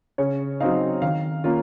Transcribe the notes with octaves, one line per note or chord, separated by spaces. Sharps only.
C#3 C#5
F#3 C4 D#4 F5
D#3 F5
A#3 C#4 F4